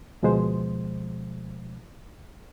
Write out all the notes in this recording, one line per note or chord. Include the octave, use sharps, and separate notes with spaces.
D2 B2 F3 G#3 C5